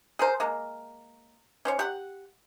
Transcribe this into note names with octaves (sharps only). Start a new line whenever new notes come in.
G#4 A#4 C5
G#3 A#3
C#4 C5 C#5
G4 F#5